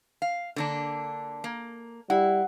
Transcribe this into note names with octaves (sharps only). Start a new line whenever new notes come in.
F5
D3 A#3 D4
A#3
G3 E4 F#5